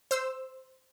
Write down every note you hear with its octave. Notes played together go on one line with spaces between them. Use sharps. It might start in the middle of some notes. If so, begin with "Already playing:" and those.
C5 E6